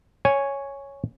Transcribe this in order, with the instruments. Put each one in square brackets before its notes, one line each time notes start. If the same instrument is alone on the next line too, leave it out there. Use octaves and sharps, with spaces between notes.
[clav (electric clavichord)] C#5 G#5